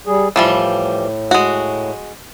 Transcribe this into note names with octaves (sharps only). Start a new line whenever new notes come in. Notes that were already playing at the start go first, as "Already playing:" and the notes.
G3 G#4
A2 E3 F3 G3
G#3 F#4